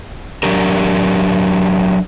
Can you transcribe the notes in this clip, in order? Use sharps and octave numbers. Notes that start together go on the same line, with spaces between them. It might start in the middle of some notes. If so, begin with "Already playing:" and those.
F#3 D4 G4 A#4